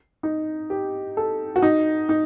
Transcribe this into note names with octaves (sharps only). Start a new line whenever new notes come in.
D#4
G4
A4
F#4
D#4
D#4